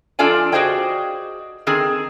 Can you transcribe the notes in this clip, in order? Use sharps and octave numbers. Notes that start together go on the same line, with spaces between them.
F2 D4 F4 A4 D5 G#5
F#4 G#4 C5 D5 D#5 G5
D#3 C4 G#4